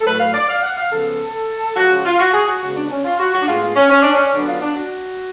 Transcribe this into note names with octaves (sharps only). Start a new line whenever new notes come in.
A4
A2 F#3 A3 B4
F5
D5
F5
F#5
F5
C#3 F3 B3 A4
C#3 F3 G#3 F#4
F4
F#4
G#4
F#4
C#3 G#3 B3 F#4
D4
C#4
F4
F#4
F#4
D4
A2 G#3 B3 F4
F4
C#4
C#4
D4
C#4
D3 F#3 B3 D4
F4
D4
F#4